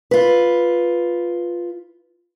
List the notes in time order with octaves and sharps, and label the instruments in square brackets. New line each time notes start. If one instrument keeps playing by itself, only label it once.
[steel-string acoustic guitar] F4 B4